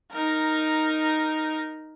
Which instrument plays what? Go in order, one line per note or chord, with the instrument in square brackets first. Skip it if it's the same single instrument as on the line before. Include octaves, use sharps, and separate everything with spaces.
[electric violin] D#4 A#4